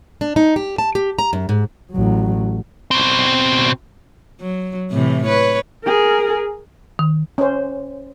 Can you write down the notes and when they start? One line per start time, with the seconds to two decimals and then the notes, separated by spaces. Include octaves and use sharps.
0.21 D4
0.36 D#4
0.56 G4
0.78 A5
0.95 G4
1.19 A#5
1.33 F#2
1.49 G#2
1.92 A1 F#3
2.91 B2 C4
4.40 F#3
4.91 A2 C3 E3
5.26 B4 C#5
5.85 G#4 A#4
6.99 D#3
7.38 C#4 C5